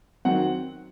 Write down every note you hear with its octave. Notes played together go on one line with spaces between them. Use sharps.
D#3 F#3 C4 F#5